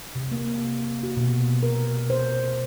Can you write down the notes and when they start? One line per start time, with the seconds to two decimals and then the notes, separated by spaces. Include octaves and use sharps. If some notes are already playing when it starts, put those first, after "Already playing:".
0.15 C3
0.32 A#3
1.03 F#4
1.17 B2
1.63 A#4
2.10 C5